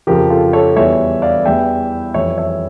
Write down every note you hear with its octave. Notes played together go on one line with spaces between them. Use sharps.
F2 C#3 F3 G4 A#4
F4 A4
A4 C#5
E2 E3 G3 C#5 E5
D5 F5
E2 E3 G3 E5 G5
F2 E3 G3 C#5 E5
C#5 E5